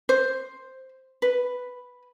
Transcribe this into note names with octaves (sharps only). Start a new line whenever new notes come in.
C5
B4